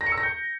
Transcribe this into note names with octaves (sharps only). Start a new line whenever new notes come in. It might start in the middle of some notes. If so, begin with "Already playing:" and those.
A#6
C#7
E6
A#6
G6